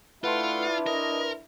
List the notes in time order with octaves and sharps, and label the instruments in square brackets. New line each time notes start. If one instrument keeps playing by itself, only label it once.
[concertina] A3 F#5 [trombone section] D4 E4 [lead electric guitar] F4 [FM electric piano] B4 C6
[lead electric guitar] A#4 [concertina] D#5